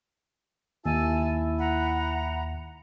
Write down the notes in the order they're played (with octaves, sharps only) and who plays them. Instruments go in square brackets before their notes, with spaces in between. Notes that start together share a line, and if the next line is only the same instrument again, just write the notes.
[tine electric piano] D#2 [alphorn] E4 [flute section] G#5 A5 E6
[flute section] F#5 A#5 B5